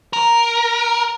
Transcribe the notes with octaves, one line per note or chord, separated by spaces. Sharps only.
A#4